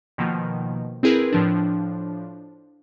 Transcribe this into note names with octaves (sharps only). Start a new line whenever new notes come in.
B2 D#3 F3 A#3
C4 E4 G#4 A#4 B4
A2 F3 D4